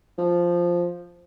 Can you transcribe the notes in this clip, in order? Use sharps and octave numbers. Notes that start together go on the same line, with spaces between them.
F3